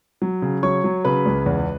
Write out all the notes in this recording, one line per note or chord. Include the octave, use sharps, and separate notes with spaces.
F#3
C#3
F#3 C#5 C#6
F#3
C#3 B4 B5
C#2
E2